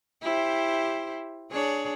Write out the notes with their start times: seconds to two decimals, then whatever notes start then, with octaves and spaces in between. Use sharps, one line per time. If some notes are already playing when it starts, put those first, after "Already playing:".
0.22 E4 G4 C5
1.51 D4 G#4 C#5